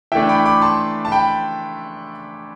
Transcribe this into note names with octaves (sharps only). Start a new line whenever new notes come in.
E3 A3 D4 E5 G5
G5 B5
B5 D6
A5 C6
A5
G5 B5